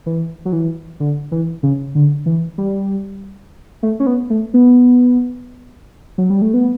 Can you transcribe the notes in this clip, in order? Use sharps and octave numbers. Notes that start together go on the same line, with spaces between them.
E3
F#3
E3
D3
E3
C#3
D3
E3
G3
A3
C#4
B3
A3
B3
F#3
G3
A3
B3